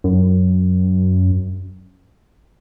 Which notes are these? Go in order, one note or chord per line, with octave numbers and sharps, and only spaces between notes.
F#2